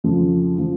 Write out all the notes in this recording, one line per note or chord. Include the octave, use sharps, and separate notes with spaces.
F2 C#3 F3
C#3 F3